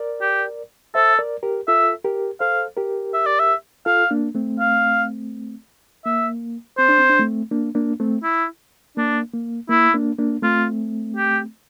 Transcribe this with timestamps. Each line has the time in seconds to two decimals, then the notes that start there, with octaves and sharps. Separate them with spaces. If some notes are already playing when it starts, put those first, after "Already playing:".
Already playing: A#4 D5
0.22 G4
0.95 A4 C5 E5
1.19 A#4 D5
1.43 G4 A#4
1.68 F4 A4 E5
2.04 G4 A#4
2.40 A4 C5 F5
2.77 G4 A#4
3.14 E5
3.26 D5
3.40 E5
3.86 F4 A4 F5
4.11 A#3 D4
4.35 A3 C4
4.60 F5
6.06 A#3 E5
6.78 C4 C5
6.89 D4
6.99 C4
7.09 D4
7.19 A3 C4
7.51 A#3 D4
7.75 A#3 D4
8.00 A3 C4
8.23 E4
8.97 A#3 D4
9.34 A#3
9.69 A#3 E4
9.94 A#3 D4
10.19 A#3 D4
10.42 A3 C4 F4
11.16 G4